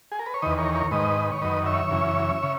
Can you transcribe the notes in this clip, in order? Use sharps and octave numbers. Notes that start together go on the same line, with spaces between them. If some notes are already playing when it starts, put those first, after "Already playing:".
G#4
A#4
B4
C#5
E2 D#3 B4 D#5
A#4 C#5
A#4 C#5
G#2 D#3 B4 D#5
B4
C#5
F#2 D#3 B4 D#5
C#5 E5
F#2 C#3 E3
C#3